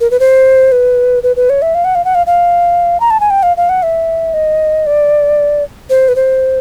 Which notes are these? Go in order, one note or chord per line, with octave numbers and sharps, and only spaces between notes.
A#4
B4
C5
B4
B4
B4
C#5
E5
F5
F#5
F5
F#5
F5
F5
A#5
A5
G#5
G5
F5
F5
F#5
E5
D#5
D5
C5
B4
C5